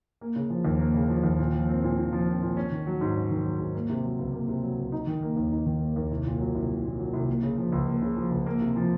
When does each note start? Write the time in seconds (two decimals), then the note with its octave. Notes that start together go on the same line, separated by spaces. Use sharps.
0.21 A#3
0.36 C#3
0.50 F3
0.65 D#2
0.79 A#3
0.94 C#3
1.10 F3
1.24 D#2
1.39 A#2
1.54 F3
1.69 C4
1.84 A#2
1.97 A#2
2.13 F3
2.27 C4
2.42 A#2
2.57 C#4
2.72 D#3
2.87 F#3
3.01 G#2
3.15 C#4
3.31 D#3
3.45 F#3
3.59 G#2
3.75 A#3
3.89 C3
4.04 F#3
4.19 C#2
4.33 A#3
4.48 C3
4.63 F#3
4.78 C#2
4.92 D#4
5.07 D#3
5.22 A#3
5.37 D#2
5.51 D#4
5.66 D#3
5.81 A#3
5.96 D#2
6.11 C2
6.26 A#2
6.40 F#3
6.54 C2
6.69 C2
6.85 A#2
6.99 F#3
7.13 C2
7.28 A#3
7.43 C#3
7.58 F3
7.72 C#2
7.87 A#3
8.02 C#3
8.17 F3
8.31 C#2
8.46 A#3
8.61 C3
8.76 F3